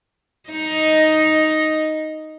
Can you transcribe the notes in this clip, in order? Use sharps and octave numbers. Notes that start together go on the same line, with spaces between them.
D#4 D#5